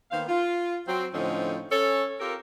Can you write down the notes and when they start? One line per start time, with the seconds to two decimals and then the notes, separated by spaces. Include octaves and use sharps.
0.11 D#3 A#3 B3 C5 F5
0.28 F4
0.87 F#3 C4
1.13 A2 D3 F3 C4 C#4 D#4
1.71 C#4 A4 C#5
2.20 C4 F4 G4 A4 A#4